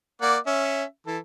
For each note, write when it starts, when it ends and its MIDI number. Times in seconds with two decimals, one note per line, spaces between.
0.22 0.37 58
0.22 0.37 74
0.22 0.37 78
0.46 0.84 61
0.46 0.84 76
1.07 1.18 52
1.07 1.18 69